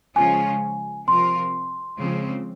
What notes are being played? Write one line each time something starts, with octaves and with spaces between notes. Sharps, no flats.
C#3 F3 G#3 C#4 F4 G#5
C3 F3 C4 F4 A#4 C6
C#3 F3 G#3 C4